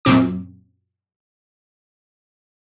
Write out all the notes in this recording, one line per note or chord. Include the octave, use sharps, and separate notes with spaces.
F#2 A#2 C4 D6